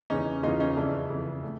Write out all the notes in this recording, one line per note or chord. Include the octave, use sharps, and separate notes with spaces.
E2 C#3 E3 C#4 D#4
E2 C#3 E3 D#4 F4
C#4 D#4
F2 C#3 E3 D4 E4
F2 C#3 E3
A2